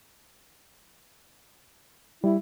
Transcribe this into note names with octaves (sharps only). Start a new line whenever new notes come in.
G3 E4